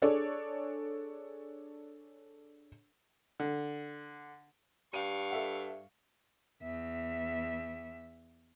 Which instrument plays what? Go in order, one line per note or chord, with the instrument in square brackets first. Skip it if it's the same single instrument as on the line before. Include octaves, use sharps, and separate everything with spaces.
[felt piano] D4 G#4 A4 C#5 D5
[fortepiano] D3
[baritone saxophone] G2 [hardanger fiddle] F5 C#6 [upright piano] D#7
[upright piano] A4 E5 F#5
[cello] E2 E5